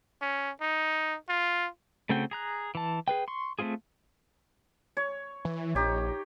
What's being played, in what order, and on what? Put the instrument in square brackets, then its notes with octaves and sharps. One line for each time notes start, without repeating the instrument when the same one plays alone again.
[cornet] C#4
D#4
F4
[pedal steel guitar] C#3 A3 C4 F#4 G5
G#4 A#5 F#6
E3 A5
G#4 B4 G5
C6 C#6
A3 B3 C4 F4 G#4
[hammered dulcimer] C#5
[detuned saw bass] E3
[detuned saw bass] A#1 [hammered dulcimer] D#4 G4 C#5